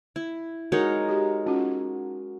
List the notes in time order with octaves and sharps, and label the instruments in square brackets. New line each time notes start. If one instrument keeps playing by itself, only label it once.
[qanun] E4
[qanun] G#3 D#4 C#5 [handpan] F#4 A#4
[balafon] G4
[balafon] C#4 F4 [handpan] F#4